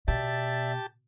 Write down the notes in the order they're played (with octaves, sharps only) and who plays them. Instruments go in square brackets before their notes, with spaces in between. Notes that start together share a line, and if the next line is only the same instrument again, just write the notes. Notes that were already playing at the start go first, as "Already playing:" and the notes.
[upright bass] B2 [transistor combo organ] G4 A5 [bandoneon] D5 E5